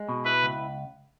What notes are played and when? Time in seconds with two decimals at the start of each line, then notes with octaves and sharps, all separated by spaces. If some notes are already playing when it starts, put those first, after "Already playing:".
Already playing: G#3
0.09 B2
0.25 E4 B4
0.43 C#2